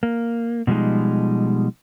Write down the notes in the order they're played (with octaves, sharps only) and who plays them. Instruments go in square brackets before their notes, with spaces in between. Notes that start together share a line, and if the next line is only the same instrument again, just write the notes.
[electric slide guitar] A#3
B2 F3 G3 G#3 D#4